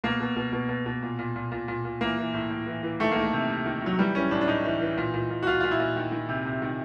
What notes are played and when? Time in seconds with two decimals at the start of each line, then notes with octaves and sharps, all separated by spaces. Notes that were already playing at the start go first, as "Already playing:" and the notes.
0.04 B2 A#3
0.20 B2
0.36 B2
0.52 B2
0.69 B2
0.86 B2
1.02 A#2
1.19 A#2
1.36 A#2
1.52 A#2
1.68 A#2
1.85 A#2
2.01 E3 A#3
2.17 E3
2.34 A2
2.50 A2
2.67 E3
2.83 E3
3.00 D#3 A3
3.11 D#3 A#3
3.23 A3
3.33 C3
3.50 C3
3.66 D#3
3.82 D#3 F#3
3.98 E3 G3
4.15 E3 C#4
4.31 A2 D4
4.41 D4
4.48 A2 D#4
4.64 E3
4.81 E3
4.97 A#2
5.14 A#2
5.30 A#2
5.43 F#4
5.47 A#2 F4
5.60 A#2 F4
5.71 E4
5.80 A#2
5.96 D#3
6.12 D#3
6.29 C3
6.45 C3
6.62 D#3